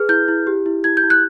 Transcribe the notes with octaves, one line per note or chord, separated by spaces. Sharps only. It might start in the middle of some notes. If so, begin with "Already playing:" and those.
Already playing: G#4 B4 F6
E4 G6
E4
G4
E4
E4 G#6
G6
E4
F#6